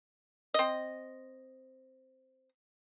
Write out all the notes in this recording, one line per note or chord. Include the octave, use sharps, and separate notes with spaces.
C4 D#5